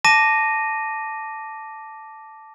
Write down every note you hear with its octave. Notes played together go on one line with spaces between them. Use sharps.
A5 D6 A#6 D#7